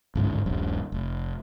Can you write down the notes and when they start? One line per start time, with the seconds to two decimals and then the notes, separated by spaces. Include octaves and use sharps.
0.15 G1 C#2 G#2
0.46 D#1 A#1 G2
0.92 F1